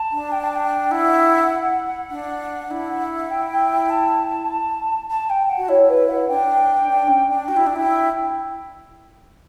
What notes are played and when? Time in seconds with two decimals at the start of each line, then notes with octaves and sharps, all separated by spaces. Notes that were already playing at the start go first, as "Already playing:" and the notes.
Already playing: A5
0.11 D4
0.31 G5
0.43 A5
0.55 G5
0.91 E4 F#5
2.10 D4
2.71 E4
3.30 G5
3.89 A5
5.09 A5
5.29 G5
5.49 F#5
5.58 F#4
5.69 E4 C#5
5.89 B4
6.08 F#5
6.28 D4 G5
6.89 D4
7.07 C#4
7.28 D4
7.48 F#4 G5
7.57 E4
7.67 D4
7.76 E4 G5